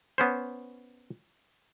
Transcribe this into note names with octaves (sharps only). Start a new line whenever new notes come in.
B3 C#4 C5